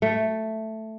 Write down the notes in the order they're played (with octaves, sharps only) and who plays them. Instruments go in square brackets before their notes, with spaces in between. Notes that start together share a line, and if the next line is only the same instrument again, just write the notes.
[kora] A3